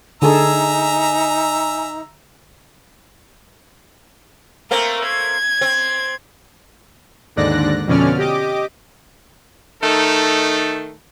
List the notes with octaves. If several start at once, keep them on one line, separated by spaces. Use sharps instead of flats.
D3 D#4 G#4 A4 E5 G#5 A#5
A3 A#3 C4 A#4
G#6
C4
D#2 G#2 D3 D5 F#6 A#6
F2 B2 D3 C#4 D5 F6
G4 D#5 D6
D#3 A3 D#4 A4